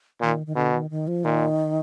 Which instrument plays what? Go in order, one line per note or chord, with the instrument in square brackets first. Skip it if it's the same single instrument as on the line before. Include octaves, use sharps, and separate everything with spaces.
[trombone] A#2 [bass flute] D#3
[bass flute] D#3
[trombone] B2 [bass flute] D3
[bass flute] D#3
D#3
F3
[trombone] A#2 [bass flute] D#3